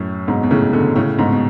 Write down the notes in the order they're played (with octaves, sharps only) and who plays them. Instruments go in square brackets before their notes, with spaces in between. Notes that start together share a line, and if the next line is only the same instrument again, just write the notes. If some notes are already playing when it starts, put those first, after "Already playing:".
Already playing: [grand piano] F#2 A2
G#2 B2
B2
A2 C#3
B2 D3
A2 C#3
G#2 B2
B2